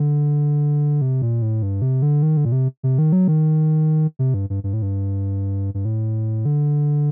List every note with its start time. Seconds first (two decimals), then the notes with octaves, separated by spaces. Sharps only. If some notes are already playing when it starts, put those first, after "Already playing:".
Already playing: D3
1.01 C3
1.22 A#2
1.42 A2
1.63 G2
1.82 C3
2.02 D3
2.23 D#3
2.37 D3
2.45 A#2
2.52 C3
2.83 C3
2.98 D#3
3.12 F#3
3.28 D#3
4.19 C3
4.34 G2
4.50 G2
4.64 G2
4.73 A2
4.82 G2
5.74 G2
5.85 A2
6.45 D3